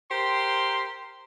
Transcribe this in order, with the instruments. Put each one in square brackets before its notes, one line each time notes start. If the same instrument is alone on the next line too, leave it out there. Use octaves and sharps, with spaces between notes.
[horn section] G4 A#4 C5 C6